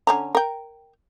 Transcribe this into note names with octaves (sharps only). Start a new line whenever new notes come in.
D3 C#4 A#5
A#4 G5